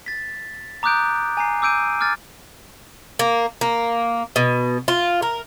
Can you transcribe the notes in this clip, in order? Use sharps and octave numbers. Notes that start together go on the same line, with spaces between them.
A6 B6
A#5 D6 D#6 F#6 G6 D7
G#5 A#5 C7
D6 E6 G6 D7 D#7
D6 F6 G#6 A6
A#3
A#3
B2
F4
A#4